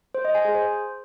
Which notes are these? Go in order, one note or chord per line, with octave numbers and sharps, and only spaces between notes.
C5
D#5
G#5
G#4
C5